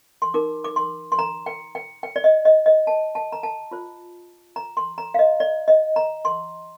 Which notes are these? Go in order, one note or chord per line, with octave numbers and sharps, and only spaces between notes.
C6
D#4 A#4 D6
D6
C6
C6
A#5
G5
G5
G5
D5
D#5
D#5
D#5
A5
A5
A#5
A5
F4 C5
A#5
C6
A#5
F5
D#5
D5
D#5
A#5
C6